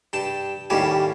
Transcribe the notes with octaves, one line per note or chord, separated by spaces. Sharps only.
G2 G5 A5
D#2 A2 G3 A#3 C#4 G4